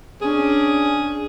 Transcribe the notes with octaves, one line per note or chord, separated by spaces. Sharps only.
C#4 D4 G#4